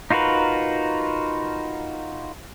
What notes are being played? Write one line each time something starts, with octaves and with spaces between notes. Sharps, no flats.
D#4 F4 F#4 A#4 B4